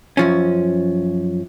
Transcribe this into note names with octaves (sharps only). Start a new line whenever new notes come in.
F#2 F3 C#4